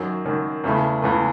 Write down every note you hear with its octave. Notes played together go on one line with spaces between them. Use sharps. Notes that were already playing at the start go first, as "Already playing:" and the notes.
Already playing: F#2 D#3 F#3
F#2 D#3 F#3
E2 C#3 E3 A3
E2 C#3 E3 A3